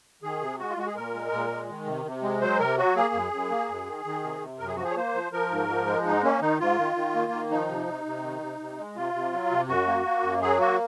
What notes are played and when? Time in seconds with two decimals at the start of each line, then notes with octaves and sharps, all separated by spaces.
0.23 D#3 G#4
0.41 C3
0.59 G#3 F#4
0.70 F4
0.77 G#3 F#4
0.87 G#4
0.95 A#2 A#4
1.14 G#3
1.32 A#2
1.51 G#3
1.69 D#3
1.87 C3
2.05 C3
2.22 G#3
2.41 F#3 C5
2.59 C3 A#4
2.78 F#3 F#4
2.96 A#3 G#4
3.14 F#2
3.33 F#2
3.50 A#3
3.69 F#2
3.86 D#3
4.05 D#3
4.23 C3
4.41 C3
4.59 F#2 A#4
4.68 G#4
4.76 F3 F#4
4.84 G#4
4.91 C#5
4.96 A#3 C5
5.15 F3
5.32 F3 A#4
5.51 G#2
5.69 F3
5.87 G#3
6.05 G#2 D#4
6.23 A#3 C#4
6.41 D#3 D#4
6.60 G#2 F4
6.78 D#3
6.96 D#3
7.15 A#3
7.32 D#3
7.51 F3 D#4
7.69 C3
7.88 C3
8.05 C3
8.24 D#3
8.42 C3
8.60 C3
8.78 G#3
8.96 C3 F4
9.14 C3
9.33 F#3
9.51 C3
9.69 F#2 F#4
9.87 A#3
10.05 A#3
10.23 F#2
10.42 F#3 G#4
10.60 A#3 F#4